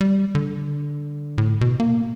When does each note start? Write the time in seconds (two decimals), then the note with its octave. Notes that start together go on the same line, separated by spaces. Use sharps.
0.01 G3
0.35 D3
1.38 A2
1.61 B2
1.80 A#3